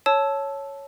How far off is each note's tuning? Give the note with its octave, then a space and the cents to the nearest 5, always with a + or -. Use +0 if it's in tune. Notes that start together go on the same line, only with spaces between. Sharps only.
C#5 +0 A5 -10 E6 +0